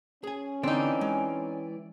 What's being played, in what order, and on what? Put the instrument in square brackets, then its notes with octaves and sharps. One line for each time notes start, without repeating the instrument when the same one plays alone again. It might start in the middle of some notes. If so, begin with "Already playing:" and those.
[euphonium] C#4 [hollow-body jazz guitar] G#4 G#5
[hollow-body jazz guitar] D3 [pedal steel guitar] E3 D5 [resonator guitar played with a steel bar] C4 D#4
[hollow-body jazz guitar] G#3